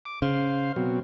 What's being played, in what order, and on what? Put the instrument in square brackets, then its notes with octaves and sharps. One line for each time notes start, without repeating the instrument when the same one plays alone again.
[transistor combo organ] D6
[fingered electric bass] C#3 [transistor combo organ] C5 F5
[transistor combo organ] B2 F#3 C4